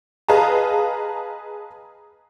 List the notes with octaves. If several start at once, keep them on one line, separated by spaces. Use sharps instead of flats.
G#4 B4 D#5 F5 A5 A#5